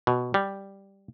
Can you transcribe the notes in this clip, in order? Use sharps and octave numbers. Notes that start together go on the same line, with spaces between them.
B2
G3